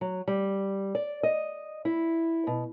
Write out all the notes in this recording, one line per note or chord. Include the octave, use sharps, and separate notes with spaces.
F#3
G3
D5
D#5
E4
B2